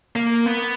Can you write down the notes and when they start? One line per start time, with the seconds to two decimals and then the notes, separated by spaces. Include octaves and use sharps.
0.16 A#3
0.46 B3